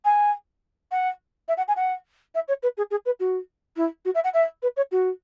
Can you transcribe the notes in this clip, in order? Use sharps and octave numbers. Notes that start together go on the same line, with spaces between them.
G#5
F#5
E5
F#5
G#5
F#5
E5
C#5
B4
G#4
G#4
B4
F#4
E4
F#4
E5
F#5
E5
B4
C#5
F#4